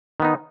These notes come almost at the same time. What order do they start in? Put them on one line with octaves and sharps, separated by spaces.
D#3 B3 D#4